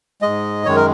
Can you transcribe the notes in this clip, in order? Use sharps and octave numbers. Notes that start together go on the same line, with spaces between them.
G#2 G#3 D#5
F#2 D#3 G#3 C#5
A#4